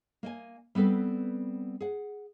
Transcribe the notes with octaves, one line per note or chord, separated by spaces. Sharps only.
A#3 D#5 G#5
G3 B3 C4 A4 B4
G#4 F#5